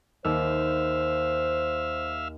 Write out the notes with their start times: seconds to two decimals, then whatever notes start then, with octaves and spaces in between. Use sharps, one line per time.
0.25 D#2 C5 E5 F5 E6